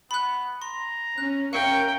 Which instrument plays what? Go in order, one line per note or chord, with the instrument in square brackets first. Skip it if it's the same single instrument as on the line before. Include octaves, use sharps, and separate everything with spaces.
[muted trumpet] B3 [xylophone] B5 F#6
[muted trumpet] A#5 [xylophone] C6
[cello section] C#4 [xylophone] F#6
[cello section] C#4 A#4 [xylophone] E5 F5 [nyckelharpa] G5 [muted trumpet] C#6